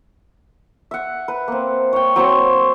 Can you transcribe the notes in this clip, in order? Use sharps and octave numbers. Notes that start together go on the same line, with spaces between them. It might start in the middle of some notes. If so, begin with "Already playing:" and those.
E5 F#5
B4
A#3 C4
C#5 G5
F#3 C4 F#4 C6